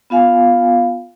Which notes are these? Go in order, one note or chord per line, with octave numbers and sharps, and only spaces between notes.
B3 F4 F5 G#5